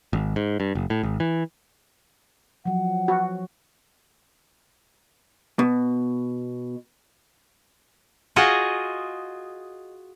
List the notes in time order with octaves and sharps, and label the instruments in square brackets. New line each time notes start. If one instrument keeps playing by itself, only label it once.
[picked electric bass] G#1
G#2
G2
F#1
A2
G#1
E3
[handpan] F3 F#3 [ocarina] F#5
[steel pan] F#4
[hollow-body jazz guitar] B2
[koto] F4 F#4 G#4 D#5